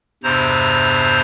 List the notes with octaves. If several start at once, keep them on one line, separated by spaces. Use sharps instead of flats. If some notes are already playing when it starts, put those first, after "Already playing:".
E2 G2 C3 C5 A#5